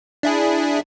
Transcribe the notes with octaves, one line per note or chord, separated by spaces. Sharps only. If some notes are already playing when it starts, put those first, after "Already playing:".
D4 E4 G#4